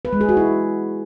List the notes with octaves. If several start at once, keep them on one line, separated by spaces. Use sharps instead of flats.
B4
G#3
G#4
F#4
E4